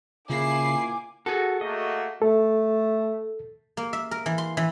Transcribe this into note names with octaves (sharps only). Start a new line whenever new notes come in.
A#2 C#3 E4 G#5 D6 C7
F#4 G#4 A4
A3 A#3 F#4 D#5
A3 A4
A#3
E5
A#4
E3
C6
E3